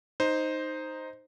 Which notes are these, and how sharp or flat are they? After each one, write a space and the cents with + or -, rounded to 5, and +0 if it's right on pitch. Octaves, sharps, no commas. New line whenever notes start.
D#4 +0 C5 +0